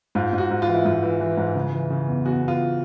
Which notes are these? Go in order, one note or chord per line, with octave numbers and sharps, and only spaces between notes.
G#2 F4
G#2
F#4
G#2
F4
E3
E4
G#2 F4
E3
E3
G#2
C#3
E3
C#3
E2
E2 F#4
E2
F4